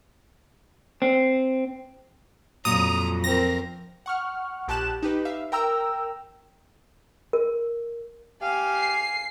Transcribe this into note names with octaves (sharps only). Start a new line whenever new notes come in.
C4
F2 A#2 F#3 A#5 D#6
C4 A#4 A#6
F#5 C#6 F6
A#1 G4 A5 F#6 E7
D#4 G4 B4
E5 F5
A#4 G5 A#5 E6
A#4
G4 F5 G#5
C7